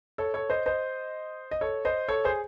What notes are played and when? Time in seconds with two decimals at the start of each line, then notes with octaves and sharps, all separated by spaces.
0.18 A4 C#5
0.34 A4 C#5
0.50 C5 D#5
0.66 C5 D#5
1.51 D#5
1.61 A4 C#5
1.85 C5 D#5
2.08 A4 C#5
2.25 G#4 C5